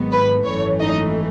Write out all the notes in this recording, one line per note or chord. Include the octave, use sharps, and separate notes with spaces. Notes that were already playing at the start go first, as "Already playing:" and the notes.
Already playing: G#1 G#2 D#3 F#3 B3
B4
G#1 F#2 E3 A3 C#5
D#4 D#5